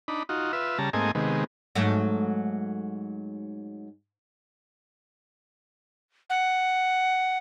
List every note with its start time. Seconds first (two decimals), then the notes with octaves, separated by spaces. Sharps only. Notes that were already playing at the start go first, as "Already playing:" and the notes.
0.08 D4 D#4 B5
0.29 D#4 F4 F#4
0.53 F4 B4 E5
0.79 C#3 G3 A5 A#5
0.93 G#2 A3 A#3 C4 D#5 G#5
1.15 C3 D#3 G#3 B3
1.75 G#2 F#3 A3
6.30 F#5